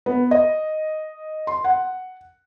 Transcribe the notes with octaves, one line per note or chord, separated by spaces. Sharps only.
B3
D#5
C6
F#5